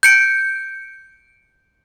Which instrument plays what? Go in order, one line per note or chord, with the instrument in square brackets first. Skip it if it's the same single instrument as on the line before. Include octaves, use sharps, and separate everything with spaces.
[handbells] G6 C#7 D7